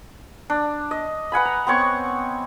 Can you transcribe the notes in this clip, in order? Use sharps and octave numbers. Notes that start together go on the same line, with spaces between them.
D4
D#5
B4 F#5 G#5 B5
A#5
B3 C4 C#5 C#6